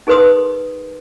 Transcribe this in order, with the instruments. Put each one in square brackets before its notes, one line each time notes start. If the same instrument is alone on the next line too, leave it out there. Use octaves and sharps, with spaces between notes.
[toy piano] D#4 G#4 A#4 B4 C6 D#6